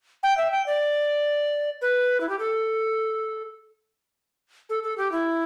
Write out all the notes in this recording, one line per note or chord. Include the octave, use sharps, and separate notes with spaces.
G5
E5
G5
D5
B4
E4
G4
A4
A4
A4
G4
E4